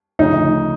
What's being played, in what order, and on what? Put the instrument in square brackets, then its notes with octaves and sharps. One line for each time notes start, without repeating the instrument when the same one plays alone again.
[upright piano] D2 C#3 F3 [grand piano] D#4